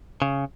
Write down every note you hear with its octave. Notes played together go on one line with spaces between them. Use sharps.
C#3